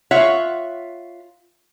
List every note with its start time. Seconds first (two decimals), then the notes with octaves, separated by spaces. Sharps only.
0.11 F4 C#5 E5 F#5